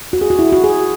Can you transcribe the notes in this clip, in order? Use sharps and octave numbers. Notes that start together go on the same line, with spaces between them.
F#4
G#4
F#4
E4
F#4
G#4